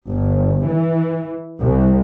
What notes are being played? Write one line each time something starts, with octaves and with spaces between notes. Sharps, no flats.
G1
E3
C2